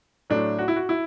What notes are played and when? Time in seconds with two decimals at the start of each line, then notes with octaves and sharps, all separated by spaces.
0.30 A2 F#3 A3 D4
0.59 F#4
0.68 E4
0.76 F#4
0.89 E4